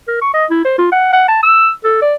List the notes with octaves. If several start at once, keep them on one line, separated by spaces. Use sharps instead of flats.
A#4
C#6
D#5
E4
C5
F4
F#5
F#5
A5
E6
A4
D5